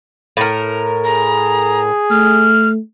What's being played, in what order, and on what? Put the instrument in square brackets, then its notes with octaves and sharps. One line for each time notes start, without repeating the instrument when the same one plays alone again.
[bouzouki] A2 A#4
[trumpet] G#4 [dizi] A#5
[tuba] A3 [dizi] F6